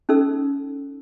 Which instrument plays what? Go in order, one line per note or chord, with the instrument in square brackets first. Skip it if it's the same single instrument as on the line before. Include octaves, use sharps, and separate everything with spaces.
[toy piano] C#4 D#4 A4 E6